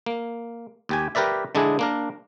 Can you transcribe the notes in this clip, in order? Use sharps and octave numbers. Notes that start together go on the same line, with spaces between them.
A#3
D#2 G4 G#5
G4 A#4 B4 D5 E5
D3 G#3 D4 E4 G#4
A#3 D4 A#4